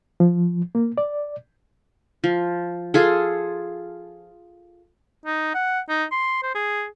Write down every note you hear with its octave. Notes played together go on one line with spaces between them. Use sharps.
F3
A#3
D5
F3
F4 G#4 A4
D#4
F#5
D#4
C6
C5
G#4